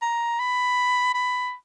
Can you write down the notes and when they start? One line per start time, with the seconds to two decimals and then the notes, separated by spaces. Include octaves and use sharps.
0.02 A#5
0.40 B5
1.14 B5